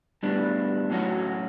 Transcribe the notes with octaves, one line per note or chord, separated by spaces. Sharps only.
A2 G3 B3 D4
A2 F#3 C#4 F#4